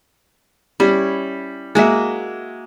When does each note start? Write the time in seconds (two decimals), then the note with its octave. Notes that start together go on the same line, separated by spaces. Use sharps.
0.80 G3 C#4 E4
1.75 G#3 A#3 F#4 E5 F#5